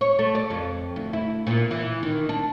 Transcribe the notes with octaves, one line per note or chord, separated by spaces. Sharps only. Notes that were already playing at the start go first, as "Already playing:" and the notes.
C#5
A3
D5
F2
D2
E4
A#2
E3
D#3
D4